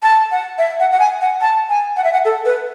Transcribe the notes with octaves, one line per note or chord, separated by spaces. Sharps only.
A5
F#5
E5
F#5
F#5
G#5
F#5
A5
G#5
F#5
E5
F#5
A4
B4